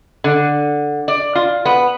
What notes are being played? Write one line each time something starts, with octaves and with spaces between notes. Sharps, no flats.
D3
D5
F4
B3